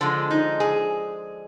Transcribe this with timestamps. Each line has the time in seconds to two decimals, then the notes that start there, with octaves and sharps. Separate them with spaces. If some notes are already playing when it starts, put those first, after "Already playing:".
0.01 D3 F3 G#3 D4
0.31 D#4
0.60 G#4